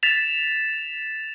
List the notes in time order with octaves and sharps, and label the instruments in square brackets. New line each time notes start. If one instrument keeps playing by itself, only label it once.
[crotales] A6 B6 E7 F7